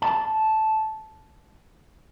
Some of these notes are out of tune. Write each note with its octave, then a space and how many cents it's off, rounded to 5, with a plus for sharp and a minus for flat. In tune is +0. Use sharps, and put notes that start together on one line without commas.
A5 -10